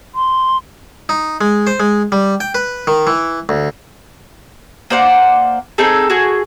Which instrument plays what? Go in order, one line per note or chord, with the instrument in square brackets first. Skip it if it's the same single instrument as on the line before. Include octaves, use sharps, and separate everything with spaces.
[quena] C6
[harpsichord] D#4
G#3
C5
G#3
G3
G5
B4
D#3
E3
D2
[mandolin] A#3 C5 D5 F#5
C4 D#4 G#4 A4
F#4 G#4